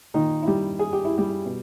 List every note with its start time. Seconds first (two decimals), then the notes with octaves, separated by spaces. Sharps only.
0.14 A#2 D#3 D#4
0.43 E4
0.47 G3 G4
0.79 G#4
0.93 G4
1.05 E4
1.17 G3 G4
1.45 B2